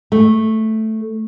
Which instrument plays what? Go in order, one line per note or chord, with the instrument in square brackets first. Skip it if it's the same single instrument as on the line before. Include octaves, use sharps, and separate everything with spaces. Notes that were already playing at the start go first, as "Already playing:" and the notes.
[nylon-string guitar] A3